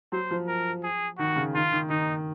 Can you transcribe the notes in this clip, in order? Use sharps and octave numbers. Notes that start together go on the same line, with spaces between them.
F#3 C5
F3
A#4
G#4
D#3 F#4
C#3
D#3 F4
D#3
D#3 D#4